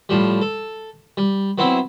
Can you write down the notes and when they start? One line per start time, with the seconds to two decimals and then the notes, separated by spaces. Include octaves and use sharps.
0.09 A2 F3 G3
0.41 A4
1.17 G3
1.58 F#3 B3 C4 E4